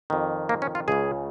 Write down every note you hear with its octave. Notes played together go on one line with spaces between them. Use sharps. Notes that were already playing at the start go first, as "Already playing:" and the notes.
F2 D#3
A#3
C#4
F4
C#2 C#3 G#4